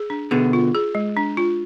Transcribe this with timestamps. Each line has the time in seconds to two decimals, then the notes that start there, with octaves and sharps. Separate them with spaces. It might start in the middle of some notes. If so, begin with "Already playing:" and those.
Already playing: G#4
0.10 D4
0.31 B2 D3 G#4
0.53 F4
0.75 G#4
0.95 G#3
1.17 D4
1.37 F4